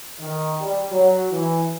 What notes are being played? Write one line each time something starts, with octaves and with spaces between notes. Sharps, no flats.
D#3
G3
F#3
E3